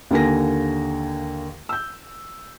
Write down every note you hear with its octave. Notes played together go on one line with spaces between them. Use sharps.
D#2 D3 A#3 G#5 A#6
E6 G6